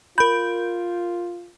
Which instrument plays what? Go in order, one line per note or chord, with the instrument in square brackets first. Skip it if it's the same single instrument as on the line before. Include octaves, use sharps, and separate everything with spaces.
[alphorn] F4 [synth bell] A#4 G6 [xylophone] B5